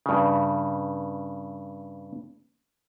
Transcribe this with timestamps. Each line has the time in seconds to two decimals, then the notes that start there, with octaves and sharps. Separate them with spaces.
0.06 G2 C#3